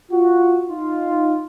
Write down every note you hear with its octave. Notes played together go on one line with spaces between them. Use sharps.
F4 F#4
D#4 F4